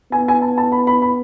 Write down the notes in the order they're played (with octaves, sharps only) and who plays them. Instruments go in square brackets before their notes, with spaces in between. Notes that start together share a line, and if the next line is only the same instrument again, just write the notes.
[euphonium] B3 [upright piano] G#5
[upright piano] G#5
A5
A5
B5
B5
B5